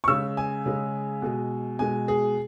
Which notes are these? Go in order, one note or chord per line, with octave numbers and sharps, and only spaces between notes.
C#6
C#3 G#3 E6
G#5
C#3 G#3
B2 G#3
B2 G#3 G#5
G#4